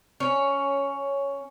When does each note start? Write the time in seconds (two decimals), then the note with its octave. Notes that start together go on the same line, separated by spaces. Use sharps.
0.20 C#4